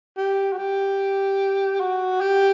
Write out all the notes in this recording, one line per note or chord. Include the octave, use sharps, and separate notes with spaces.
G4
F#4
G4
F#4
G4